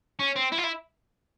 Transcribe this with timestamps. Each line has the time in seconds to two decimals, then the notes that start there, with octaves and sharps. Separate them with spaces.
0.19 C#4
0.36 C4
0.52 E4
0.58 F4
0.64 E4